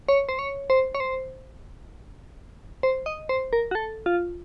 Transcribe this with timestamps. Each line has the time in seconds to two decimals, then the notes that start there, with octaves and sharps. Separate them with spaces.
0.08 C#5
0.29 C5
0.39 C#5
0.70 C5
0.95 C#5
1.00 C5
2.83 C5
3.06 D#5
3.29 C5
3.53 A#4
3.71 F#4
3.75 A4
4.06 F4